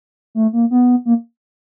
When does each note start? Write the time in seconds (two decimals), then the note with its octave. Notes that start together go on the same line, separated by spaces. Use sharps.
0.35 A3
0.53 A#3
0.71 B3
1.06 A#3